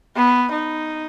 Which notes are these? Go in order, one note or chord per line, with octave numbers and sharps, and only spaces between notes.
B3
D#4